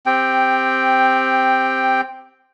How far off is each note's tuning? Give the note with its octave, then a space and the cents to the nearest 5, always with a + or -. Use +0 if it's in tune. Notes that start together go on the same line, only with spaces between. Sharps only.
C4 +0 G4 +15 G5 +0